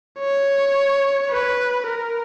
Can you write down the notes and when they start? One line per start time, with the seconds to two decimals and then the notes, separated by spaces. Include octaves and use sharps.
0.19 C#5
1.31 B4
1.87 A#4